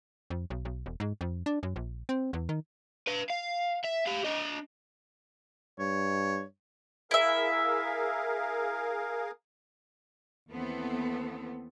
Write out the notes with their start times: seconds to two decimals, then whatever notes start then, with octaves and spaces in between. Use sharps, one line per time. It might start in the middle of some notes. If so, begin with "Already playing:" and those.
0.30 F2
0.50 B1
0.65 B1
0.86 E1
1.00 G#2
1.21 F2
1.46 D4
1.63 F#2
1.76 A#1
2.09 C4
2.33 E2
2.49 D#3
3.07 B4 F5
3.30 F5
3.85 E5
4.06 G4 F5
4.25 D4 D#5
5.79 G2 C#5
7.11 E4 G#4 A#4 E5 F5
10.50 D#2 E3 B3 C4 A4